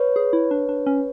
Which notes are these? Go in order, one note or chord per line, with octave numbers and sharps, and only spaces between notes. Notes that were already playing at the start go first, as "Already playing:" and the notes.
Already playing: B4 C#5
G#4
E4
D4
D4
C#4